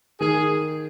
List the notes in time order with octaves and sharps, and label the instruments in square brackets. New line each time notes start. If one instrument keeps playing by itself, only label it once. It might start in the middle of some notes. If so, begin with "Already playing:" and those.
[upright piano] D#3 [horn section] G#4